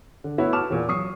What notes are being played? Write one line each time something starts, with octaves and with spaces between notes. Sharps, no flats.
D3
A3 B3 E4 F#4 C#5 F#5
A5 C#6 D6 F6 E7
E2 A#2
F#3 C#6 D#6 C7